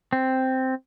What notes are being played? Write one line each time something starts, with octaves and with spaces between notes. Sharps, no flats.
C4